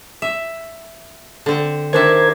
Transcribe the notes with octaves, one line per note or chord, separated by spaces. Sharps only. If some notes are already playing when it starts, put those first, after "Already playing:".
E5
D3 C4
D#3 D4 A#4 C5 E5 G#6